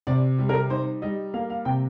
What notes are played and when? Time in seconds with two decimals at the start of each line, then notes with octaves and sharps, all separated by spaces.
0.07 C3 D5
0.39 G3
0.49 A#4
0.70 D#4 C5
1.02 G3 D#5
1.34 A#3 F5
1.50 F5
1.65 C3 G5